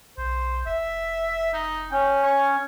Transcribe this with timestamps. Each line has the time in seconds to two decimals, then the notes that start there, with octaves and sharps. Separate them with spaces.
0.18 B1 C5
0.66 F1 E5
1.53 D#4
1.91 C#4 G5
2.23 C#5